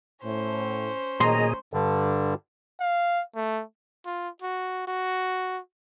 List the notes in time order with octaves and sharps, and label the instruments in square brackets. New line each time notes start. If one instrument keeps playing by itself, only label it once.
[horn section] A2 [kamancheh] C#4 C5
[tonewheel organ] A#2 G#4 D#5 [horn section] D#3 F#3 A#5 [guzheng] C6
[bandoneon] G2 D3
[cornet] F5
A3
[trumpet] F4
F#4
F#4